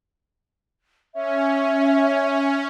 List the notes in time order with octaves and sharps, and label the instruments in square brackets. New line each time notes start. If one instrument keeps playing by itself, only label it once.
[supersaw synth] C#4 [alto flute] E5